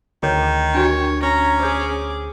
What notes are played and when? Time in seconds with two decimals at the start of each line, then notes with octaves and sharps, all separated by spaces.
0.23 D2 D#3 G#4 C#5
0.75 D4 F#4 G4 C#5
1.23 C#4 A#5
1.60 G#4 C5 C#5 D6